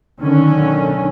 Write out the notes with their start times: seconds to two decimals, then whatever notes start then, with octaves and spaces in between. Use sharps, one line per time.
0.20 B1 D3 D#3 C#4